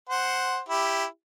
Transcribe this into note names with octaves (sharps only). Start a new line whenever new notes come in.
C5 F#5
E4 G4